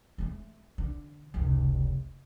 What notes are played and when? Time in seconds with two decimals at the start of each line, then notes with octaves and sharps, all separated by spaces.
0.18 G#3 A3
0.78 D3
1.34 F1 C#2